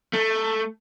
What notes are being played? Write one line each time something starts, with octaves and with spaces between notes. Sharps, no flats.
A3